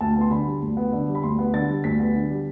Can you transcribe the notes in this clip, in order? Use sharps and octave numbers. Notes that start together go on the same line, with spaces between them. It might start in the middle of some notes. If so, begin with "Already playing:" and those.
D2 A5
B3
C6
D3 B5
G3
D2
B3
D3
G3
B5
D2 C6
B3
D3 A6
G3
D2 B6
B3
D3
G3